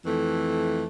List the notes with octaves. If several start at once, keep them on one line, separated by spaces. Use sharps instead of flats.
F2 E3 A3